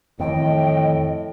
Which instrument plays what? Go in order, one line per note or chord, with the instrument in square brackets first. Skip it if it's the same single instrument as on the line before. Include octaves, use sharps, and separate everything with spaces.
[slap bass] F2 D#3 E3 [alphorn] A2 [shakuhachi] D#5 [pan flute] G5